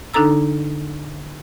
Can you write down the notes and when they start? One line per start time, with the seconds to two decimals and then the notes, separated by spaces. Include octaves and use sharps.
0.14 D3 D4 D#4 A4 A#5 E6